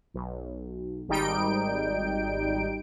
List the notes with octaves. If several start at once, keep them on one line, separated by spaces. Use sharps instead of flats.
B1
G#1 G3 D#4 G5 D7